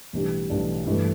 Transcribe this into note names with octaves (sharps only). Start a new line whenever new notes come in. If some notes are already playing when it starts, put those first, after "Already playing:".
B1 A2 E3 G3 D4
B1 A2 E3 G3 D4
G2 E3 A3